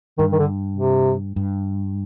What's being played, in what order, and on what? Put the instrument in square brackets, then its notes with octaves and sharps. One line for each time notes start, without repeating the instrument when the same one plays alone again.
[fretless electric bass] G2 [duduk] D#3
[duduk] D#3
D3
C3
[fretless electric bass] G2